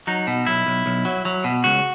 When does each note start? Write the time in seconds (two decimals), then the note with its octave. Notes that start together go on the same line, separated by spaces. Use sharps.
0.07 F#3 D#4
0.27 B2
0.46 B1 E4
0.67 B1
0.86 B1
1.05 F#3
1.25 F#3
1.44 B2
1.64 C#2 F#4